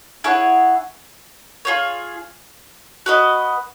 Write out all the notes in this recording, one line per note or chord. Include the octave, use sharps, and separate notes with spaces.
E4 G#4 C#5 F#5
F4 G#4 C#5
F#4 B4 D#5